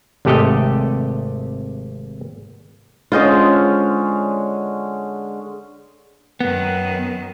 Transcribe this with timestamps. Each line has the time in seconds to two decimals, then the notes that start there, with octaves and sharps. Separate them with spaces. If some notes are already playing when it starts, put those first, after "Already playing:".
0.25 G#1 C3 A3 G4 A4 D#5
3.12 D3 G#3 C#4 F4 C5 D#5
6.41 F#2 D#3 B3